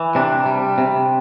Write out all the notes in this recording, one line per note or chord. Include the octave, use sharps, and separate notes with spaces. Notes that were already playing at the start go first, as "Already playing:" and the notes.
Already playing: E3
C3 D4
G3
C3